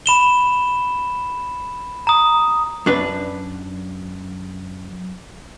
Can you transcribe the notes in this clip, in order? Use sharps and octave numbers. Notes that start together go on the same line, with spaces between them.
B5 E7 G7
A#5 D#6
F#2 D4 B4